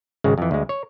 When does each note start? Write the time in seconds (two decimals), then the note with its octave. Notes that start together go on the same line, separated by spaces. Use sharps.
0.24 G#1 C#3 G#3
0.38 F2 E3
0.51 D2 G#3
0.69 C#5